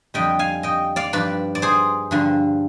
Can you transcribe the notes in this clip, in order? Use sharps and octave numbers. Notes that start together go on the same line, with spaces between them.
F2 D3 G3 D#5 G5
F5 G#5
D#5 G5
D5 F5
G2 F3 B4 D5
D5
G#4 C5
G2 D3 F3